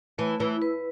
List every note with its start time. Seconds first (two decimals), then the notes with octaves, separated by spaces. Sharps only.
0.18 E3 A3
0.40 E3 E4
0.62 B4